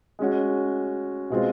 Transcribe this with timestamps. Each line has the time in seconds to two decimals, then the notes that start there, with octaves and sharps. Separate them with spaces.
0.19 G#3 C#4 F#4
1.30 B2 G#3 C4 F4